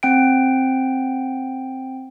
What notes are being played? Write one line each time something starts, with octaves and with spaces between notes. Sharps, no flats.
C4 G5 D7